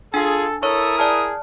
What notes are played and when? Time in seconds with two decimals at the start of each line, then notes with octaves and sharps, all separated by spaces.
0.14 D4 F4 G#4 A4 G#5
0.63 E4 A4 A#4 C#5 C#6 D#6
0.98 G#4 D5 A5 F6